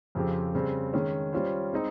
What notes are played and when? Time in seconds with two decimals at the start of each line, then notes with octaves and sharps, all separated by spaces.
0.15 F2 C#3 F3 C4 G4
0.54 C#3 G3 C4
0.94 D#3 G#3 C#4
1.33 G3 C#4 F4 C5
1.73 G#3 C4 D#4